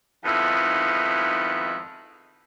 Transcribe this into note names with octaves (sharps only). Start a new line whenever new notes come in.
F2 G#2 D#3 B3 E4